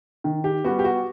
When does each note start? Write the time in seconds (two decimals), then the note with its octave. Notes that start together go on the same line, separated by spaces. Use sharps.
0.24 D#3
0.44 G4
0.64 G3 B3 F#4
0.79 G4
0.84 F#4